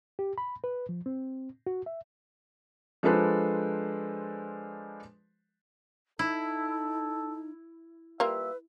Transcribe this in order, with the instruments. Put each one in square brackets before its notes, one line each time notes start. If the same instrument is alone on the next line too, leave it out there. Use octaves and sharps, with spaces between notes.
[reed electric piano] G4
B5
B4
F3
C4
F#4
E5
[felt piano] F3 G#3 D4 A4 B4 C5
[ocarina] D#4 [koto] E4 [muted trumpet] A4
[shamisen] G3 A#3 F4 [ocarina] B4 [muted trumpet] E5